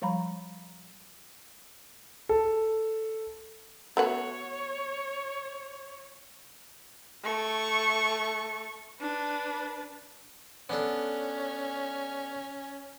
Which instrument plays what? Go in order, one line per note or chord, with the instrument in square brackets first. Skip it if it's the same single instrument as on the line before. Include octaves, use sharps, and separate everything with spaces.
[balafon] F3 G3 F5 A#5 B5
[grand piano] A4
[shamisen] A3 B3 F#4 [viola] C#5
[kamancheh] A3 C#6
D4 B4
[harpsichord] B3 D4 A4 [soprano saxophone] C#4